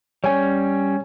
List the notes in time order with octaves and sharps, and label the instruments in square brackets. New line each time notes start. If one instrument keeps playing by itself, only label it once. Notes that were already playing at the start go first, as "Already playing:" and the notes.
[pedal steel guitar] G3 C#4 [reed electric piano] C#5 G#5